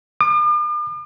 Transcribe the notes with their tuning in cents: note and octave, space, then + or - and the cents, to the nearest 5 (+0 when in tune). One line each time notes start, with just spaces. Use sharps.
D6 +45